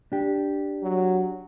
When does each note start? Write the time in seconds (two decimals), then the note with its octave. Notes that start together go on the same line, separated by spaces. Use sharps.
0.12 D4 G4
0.83 F#3